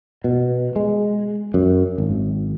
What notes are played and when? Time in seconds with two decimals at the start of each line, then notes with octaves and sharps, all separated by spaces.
0.24 B2
0.76 G#3
1.54 F#2
1.98 G#1